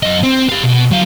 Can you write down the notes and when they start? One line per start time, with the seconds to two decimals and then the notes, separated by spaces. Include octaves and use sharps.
0.03 F#2 D#5
0.23 C4
0.50 G4 F5
0.63 B2
0.91 F#3 F5